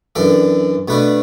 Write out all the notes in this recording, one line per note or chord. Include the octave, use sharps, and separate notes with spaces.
F#2 E3 D4 A4 D5
B2 A3 D4 B4 D5